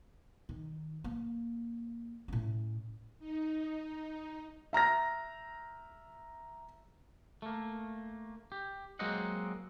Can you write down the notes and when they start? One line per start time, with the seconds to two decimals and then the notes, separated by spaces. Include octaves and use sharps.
0.49 D#3 D#4
1.04 A#3
2.28 A2 C#4
3.20 D#4
4.73 E5 A#5 F6 A#6
7.42 A3 A#3
8.52 G4
8.99 F#3 G#3 A#3 C4 D#5 F#5